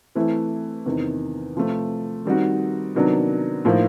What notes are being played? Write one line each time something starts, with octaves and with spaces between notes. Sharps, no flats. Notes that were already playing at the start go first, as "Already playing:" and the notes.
E3 A3 C4 E4
E2 C3 D#3
C3 F3 A3
D#3 G3 C4 D#4 F#4
C3 D#3 F#3 B3 D4
A2 F3 A#3 D#4